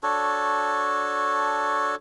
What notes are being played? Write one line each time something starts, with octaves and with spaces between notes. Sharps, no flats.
D4 F#4 A4 C#5